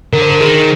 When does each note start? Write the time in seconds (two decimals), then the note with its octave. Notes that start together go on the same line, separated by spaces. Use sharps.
0.13 D3 A#4
0.22 C5
0.30 A#4
0.41 D#3 G#4